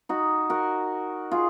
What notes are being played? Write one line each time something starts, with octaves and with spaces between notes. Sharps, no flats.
D#4 F#4
F#4 A#4
F4 G#4